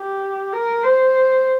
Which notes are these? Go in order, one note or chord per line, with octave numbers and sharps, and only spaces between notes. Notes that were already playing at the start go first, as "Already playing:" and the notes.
Already playing: G4
A#4
C5